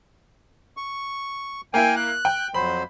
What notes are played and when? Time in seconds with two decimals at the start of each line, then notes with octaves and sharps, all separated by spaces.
0.77 C#6
1.74 A#3 E4 G5 G#5
1.96 F#6
2.25 G5
2.54 F2 F#3 C5 B5